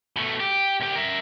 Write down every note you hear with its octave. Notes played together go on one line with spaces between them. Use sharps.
B2 A3
G4
C2 G4
A#4 E5